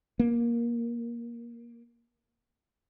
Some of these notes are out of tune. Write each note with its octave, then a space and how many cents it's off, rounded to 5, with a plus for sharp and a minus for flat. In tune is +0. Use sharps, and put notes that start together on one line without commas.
A#3 +15